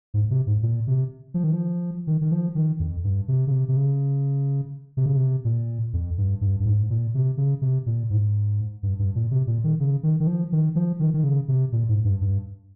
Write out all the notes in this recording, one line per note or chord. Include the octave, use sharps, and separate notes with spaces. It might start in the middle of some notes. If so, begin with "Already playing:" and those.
G#2
C3
G#2
A#2
C3
F3
D#3
F3
D#3
D#3
F3
D#3
F2
G2
C3
C#3
C3
C3
C#3
C3
C#3
C3
A#2
F2
G2
G2
G2
G#2
A#2
C3
C#3
C3
A#2
G#2
G2
G2
A#2
C3
A#2
D#3
C#3
D#3
D#3
F3
D#3
F3
D#3
D#3
C#3
C3
A#2
G#2
G2
G2